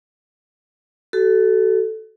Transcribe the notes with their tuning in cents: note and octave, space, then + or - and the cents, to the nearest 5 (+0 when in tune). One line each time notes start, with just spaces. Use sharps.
F#4 +35 A4 -5